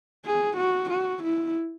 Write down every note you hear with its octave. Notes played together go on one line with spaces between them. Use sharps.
G#4
F#4
F#4
E4